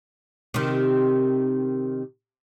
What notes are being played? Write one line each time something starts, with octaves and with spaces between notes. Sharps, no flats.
C3 D#3